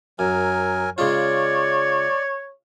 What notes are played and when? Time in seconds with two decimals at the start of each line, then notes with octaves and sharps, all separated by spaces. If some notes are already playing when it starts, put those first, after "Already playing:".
0.19 F#2 F#3 A#4 G#5
0.98 C#3 G#3 F4 C#5 D5